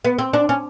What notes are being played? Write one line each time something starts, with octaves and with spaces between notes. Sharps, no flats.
B3
C4
D4
C#4